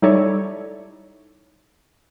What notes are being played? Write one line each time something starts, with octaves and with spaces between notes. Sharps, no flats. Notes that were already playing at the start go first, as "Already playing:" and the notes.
G3 D#4 E4 A4 C#5 D5